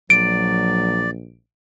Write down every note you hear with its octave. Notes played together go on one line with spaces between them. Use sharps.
A#1 F#3 D5 D7